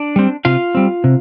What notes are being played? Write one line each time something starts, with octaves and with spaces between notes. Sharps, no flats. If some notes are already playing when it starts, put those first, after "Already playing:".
Already playing: D4 D5
G3 C4
C3 F4 F5
G3 C4
C3